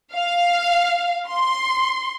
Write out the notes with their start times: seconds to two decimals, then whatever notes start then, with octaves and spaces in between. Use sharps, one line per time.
0.14 F5
1.27 C6